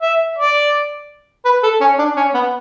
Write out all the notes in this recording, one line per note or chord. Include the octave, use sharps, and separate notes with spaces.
E5
D5
B4
A4
C#4
D4
C#4
B3